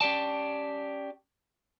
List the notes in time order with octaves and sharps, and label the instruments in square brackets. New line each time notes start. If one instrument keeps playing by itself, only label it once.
[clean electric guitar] C#4 G4 D5 A5